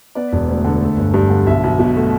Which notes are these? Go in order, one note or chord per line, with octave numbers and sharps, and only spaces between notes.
B3 D5
E1
D2
D3
A3
G1
G2
D3
B1 E5
B1
B2
A3